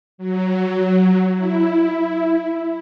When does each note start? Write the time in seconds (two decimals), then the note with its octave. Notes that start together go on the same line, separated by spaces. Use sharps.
0.18 F#3
1.36 E4